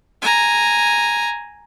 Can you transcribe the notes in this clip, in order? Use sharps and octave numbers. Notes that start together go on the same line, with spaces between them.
G#5 A#5